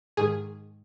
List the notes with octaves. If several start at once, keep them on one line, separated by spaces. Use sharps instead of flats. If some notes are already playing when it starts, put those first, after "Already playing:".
G#2 D#3 G#4